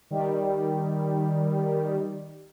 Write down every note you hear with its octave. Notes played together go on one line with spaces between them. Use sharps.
D#3 G3